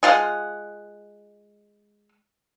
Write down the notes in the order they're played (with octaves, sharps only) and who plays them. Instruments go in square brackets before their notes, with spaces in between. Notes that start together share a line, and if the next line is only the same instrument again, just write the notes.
[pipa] G#3 F4 F5 F#5